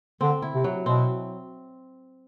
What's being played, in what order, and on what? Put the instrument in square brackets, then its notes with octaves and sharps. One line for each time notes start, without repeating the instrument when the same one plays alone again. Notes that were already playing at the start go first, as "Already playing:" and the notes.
[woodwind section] D3 [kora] C4
[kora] E4
[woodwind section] C3
[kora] F#3
[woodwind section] B2 [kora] C4